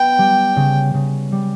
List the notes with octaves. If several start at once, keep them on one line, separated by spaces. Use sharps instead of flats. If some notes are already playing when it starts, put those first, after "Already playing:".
Already playing: B3 G5
G3
C#3
C#3
G3